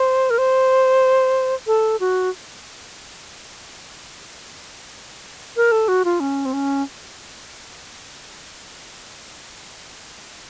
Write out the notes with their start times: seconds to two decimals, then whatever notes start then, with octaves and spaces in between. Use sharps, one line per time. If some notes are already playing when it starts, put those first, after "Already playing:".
Already playing: C5
0.30 A#4
0.38 C5
1.67 A4
2.00 F#4
5.57 A#4
5.72 A4
5.88 F#4
6.05 F4
6.20 C#4
6.46 C4
6.53 C#4